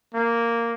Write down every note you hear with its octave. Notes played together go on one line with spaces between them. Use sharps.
A#3